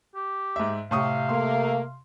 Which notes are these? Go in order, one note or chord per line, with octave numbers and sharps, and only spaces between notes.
G4
G#2 E5
A2 C3 F5 C#6 D#6
A3 A#3 C6